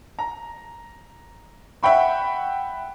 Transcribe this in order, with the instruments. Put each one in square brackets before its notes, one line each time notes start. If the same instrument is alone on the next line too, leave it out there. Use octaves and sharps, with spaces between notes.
[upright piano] A#5
E5 F#5 G5 B5 C#6